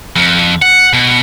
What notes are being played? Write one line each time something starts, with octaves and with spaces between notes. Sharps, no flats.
F2
F#5
B2